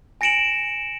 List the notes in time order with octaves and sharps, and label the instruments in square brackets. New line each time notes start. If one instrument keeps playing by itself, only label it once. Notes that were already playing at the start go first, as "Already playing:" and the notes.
[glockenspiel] G#5 A#6 C#7 D7 E7 F#7